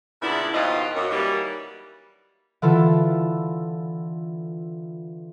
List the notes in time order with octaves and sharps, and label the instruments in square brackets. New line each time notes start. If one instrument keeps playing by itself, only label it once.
[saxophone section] A#2 C#3 B3 D4 E4
D#2 B2 F3 F4 G4 D#5
F#2
D#3 E3 F#3 G3 A#3
[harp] D3 E3 F4 A4